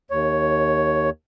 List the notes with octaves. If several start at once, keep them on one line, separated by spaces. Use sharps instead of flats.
D#2 C#5